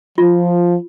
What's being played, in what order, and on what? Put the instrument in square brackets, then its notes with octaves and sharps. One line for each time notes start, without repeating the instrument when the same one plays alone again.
[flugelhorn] F3 [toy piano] F4